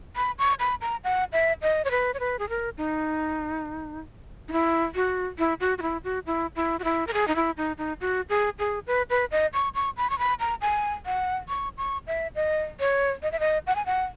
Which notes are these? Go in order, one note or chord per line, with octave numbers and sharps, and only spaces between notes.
B5
C#6
B5
A#5
F#5
E5
D#5
C#5
B4
C#5
B4
G#4
A#4
D#4
D#4
E4
F#4
E4
F#4
F#4
E4
F#4
E4
E4
F#4
E4
A#4
G#4
D#4
E4
D#4
D#4
F#4
G#4
G#4
B4
B4
D#5
C#6
C#6
B5
C#6
B5
A#5
G#5
F#5
C#6
C#6
E5
D#5
C#5
D#5
E5
D#5
F#5
G#5
F#5